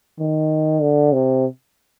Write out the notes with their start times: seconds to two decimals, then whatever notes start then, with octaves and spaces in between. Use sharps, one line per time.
0.19 D#3
0.81 D3
1.13 C3